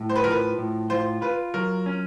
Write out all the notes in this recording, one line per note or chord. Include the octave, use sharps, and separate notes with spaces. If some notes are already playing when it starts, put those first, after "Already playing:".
Already playing: A2
C5
B4
F3 A#4
B4
A2
F4 C5
F4 B4
F#3 A#4
C#4